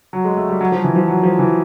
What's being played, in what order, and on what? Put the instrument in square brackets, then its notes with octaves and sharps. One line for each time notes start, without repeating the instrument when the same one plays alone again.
[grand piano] F#3
G#3
A3
G3
F#3
F3
E3
F3
F#3
F3
E3